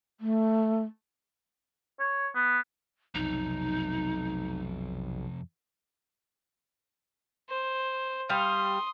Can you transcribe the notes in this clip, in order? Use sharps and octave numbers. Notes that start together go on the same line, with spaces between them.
A3
C#5
B3
B1 F2 C3 D#4
C5
G3 F5 C6 D#6